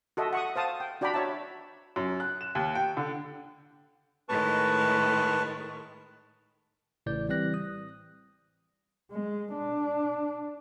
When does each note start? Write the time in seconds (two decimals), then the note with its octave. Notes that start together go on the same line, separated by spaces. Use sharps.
0.17 F#4 A4 D#5 E5
0.33 F#5 C#6 D#6
0.56 C5 F5 A5 D#6
0.80 G5
1.01 D4 F#4 D5 G5 A#5 B5
1.14 F#4 C#5 E5 A5
1.96 F#2
2.20 F#6
2.41 E7
2.55 D#2
2.75 G5
2.97 D3
4.29 A2 D#3 G#3 B4 A5 C#6
7.06 A1 A2 C#3 E3 D5 G6
7.29 E3 G3 C4 D5 F#6 A#6
7.54 D#6
9.11 G#3
9.53 D4